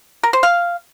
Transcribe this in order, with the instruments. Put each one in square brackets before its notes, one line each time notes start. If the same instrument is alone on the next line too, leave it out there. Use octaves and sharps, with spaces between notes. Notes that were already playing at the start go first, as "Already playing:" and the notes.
[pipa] A#4
C5
F5